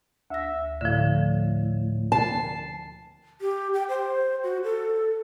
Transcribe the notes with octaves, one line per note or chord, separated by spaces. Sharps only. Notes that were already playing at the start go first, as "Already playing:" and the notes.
D2 E5 A#6
A2 D3 F3
A5 C7
G4
G5
C5
F#4
A4